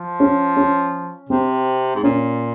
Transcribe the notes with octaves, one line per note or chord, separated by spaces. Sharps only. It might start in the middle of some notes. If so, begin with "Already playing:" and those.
Already playing: F3
C#4
C#4
C3 C4
G#2
A#2 C#4